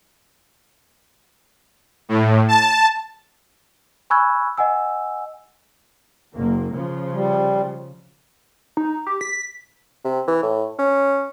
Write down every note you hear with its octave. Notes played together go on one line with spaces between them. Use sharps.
A2
A5
G#5 B5 C#6 E6 F#6 G#6
D#5 F#5 G#5 E6
F#1 A#3
C#3 F3
G3
D#4
G4
B6
C3
E3
A2
C#4